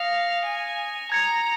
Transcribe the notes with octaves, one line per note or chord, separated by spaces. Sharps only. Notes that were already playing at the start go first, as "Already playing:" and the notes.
Already playing: F5 D#6 A#6 C#7 F7
G#5
A#5 G#6 C#7 F7